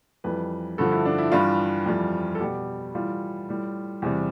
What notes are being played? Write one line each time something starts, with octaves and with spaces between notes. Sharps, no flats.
F2 E3 G3 B4
G2 D3 F3 A4
E4
D4
E4
G2 E3 G3 F4
F2 E3 G3
A4
B2 G3 G4
A2 E3 G3 F4
A2 G3
E2 C3 G3